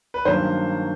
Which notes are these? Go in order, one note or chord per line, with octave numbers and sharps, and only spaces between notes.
B4
G2 D#3 F#3 A#3 C#4 C5